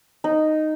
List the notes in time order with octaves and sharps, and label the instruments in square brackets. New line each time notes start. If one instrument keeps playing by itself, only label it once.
[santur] D#4